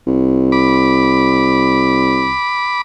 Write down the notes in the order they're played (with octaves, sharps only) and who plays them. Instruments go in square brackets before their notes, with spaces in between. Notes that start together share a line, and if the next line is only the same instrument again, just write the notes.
[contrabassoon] C2
[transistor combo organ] B5 D6